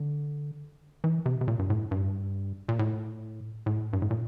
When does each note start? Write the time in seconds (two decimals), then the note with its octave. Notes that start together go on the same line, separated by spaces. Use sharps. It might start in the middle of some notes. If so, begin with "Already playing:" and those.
Already playing: D3
1.04 E3
1.26 C3
1.41 C3
1.48 A#2
1.59 G2
1.70 A2
1.91 G2
2.69 A#2
2.79 A2
3.66 A2
3.93 G2
4.02 A2
4.11 A#2